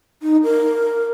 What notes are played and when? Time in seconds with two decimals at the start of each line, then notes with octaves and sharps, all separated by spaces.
0.22 D#4
0.44 A#4